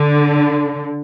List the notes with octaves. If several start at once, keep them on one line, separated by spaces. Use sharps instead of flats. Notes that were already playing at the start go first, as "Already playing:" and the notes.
Already playing: D3